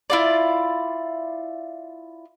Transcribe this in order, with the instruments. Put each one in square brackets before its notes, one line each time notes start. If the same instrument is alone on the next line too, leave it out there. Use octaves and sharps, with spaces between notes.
[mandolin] E4 F4 D5